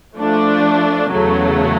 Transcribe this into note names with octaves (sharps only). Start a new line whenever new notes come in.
F3 A3 D4
E2 C#3 F#3 A3